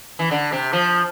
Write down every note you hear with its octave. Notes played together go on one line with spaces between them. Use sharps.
E3
D3
C3
F3